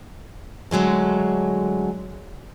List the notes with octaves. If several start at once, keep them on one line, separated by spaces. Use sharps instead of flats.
D3 F#3 G#3 A3